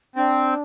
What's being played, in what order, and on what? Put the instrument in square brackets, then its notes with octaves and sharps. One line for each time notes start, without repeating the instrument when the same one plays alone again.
[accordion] C4 [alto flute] D4